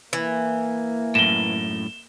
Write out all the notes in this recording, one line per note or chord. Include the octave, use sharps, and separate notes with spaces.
E3 A#3
F#2 A2 E7 G7